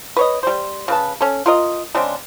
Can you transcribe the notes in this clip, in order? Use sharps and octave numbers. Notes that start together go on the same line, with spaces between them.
B4 C#5 D#5
G3 C5
C#3 B4 A5
C#4 A4
F4 A#4 D#5
C#3 G#3 C4 D4